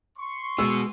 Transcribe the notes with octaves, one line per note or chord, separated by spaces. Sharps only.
C6 C#6
B2 G#3 B3 F#4 G#4 E6